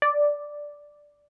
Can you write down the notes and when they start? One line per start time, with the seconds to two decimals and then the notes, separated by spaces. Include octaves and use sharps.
0.02 D5